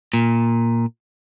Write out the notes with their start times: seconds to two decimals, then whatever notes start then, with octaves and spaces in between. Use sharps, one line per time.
0.13 A#2